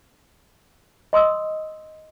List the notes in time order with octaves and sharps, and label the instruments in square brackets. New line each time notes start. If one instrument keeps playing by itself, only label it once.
[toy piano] D#5 C6 D#6 E6